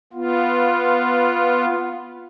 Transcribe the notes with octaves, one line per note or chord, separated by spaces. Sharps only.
B3 F4